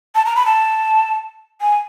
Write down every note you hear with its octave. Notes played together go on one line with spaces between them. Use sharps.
A5
A#5
B5
A5
G#5